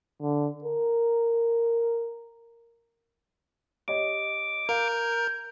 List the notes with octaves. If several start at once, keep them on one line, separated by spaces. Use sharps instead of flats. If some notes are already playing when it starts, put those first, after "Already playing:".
D3
A#4
G4 C#5 D#5 D6
A#4 F5 G6